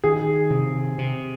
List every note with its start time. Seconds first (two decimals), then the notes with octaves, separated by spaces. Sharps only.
0.04 D#3 G#4
0.50 C3
0.98 C3